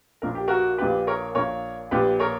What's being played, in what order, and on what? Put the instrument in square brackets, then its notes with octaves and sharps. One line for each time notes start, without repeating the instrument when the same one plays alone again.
[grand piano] A#1 A#2 A#3 D4 A#4
G4
F#4 A#4
A#1 A#2 A#3 D4 G4 B4
A#4 C#5
A#1 A#2 A#3 D4 A#4 C#5
A#1 A#2 A#3 D4 G4 B4
A#4 C#5